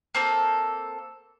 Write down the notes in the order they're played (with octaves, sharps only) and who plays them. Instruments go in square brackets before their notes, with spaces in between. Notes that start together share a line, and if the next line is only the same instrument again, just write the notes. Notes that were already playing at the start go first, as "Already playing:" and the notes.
[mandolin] A#3 C4 A4